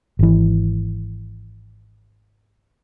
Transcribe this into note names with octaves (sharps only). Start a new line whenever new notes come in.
G#1 E3